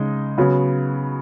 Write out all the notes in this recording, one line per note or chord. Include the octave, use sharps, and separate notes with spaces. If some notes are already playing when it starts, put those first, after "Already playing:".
Already playing: C#3 G#3 D#4
C#3 F#3 B3